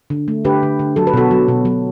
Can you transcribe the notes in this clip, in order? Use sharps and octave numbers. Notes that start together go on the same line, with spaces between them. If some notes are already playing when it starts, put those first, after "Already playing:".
D3
A3
D3 G4 B4
D3
D3
F#3 A4
B4
B2 F#4 A4
F#3
B2
F#3